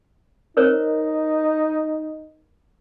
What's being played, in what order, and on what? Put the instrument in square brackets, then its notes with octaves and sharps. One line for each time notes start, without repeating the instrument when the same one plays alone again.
[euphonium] D#4 [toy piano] A#4 C5 C#5